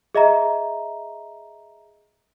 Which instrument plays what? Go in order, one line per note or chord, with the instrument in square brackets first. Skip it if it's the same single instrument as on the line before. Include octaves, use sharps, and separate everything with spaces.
[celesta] G#4 D#5 E5 A#5